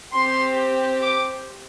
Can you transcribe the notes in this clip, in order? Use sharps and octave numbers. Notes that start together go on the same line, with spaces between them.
C4 G4 C6
D6